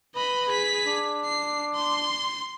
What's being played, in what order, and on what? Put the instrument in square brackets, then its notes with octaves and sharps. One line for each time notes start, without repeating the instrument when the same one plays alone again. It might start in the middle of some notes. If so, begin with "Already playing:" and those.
[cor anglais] B4 [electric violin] D#5 B5
[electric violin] G#4 B6
[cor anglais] D4
[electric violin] C7
C6